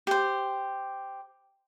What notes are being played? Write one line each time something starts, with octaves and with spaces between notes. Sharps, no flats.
G4 C5